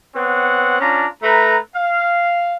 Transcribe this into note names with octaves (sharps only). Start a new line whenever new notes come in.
B3 C4 C#5 F#5
C#4 D4 F4 A#5
A3 B4 A#5
F5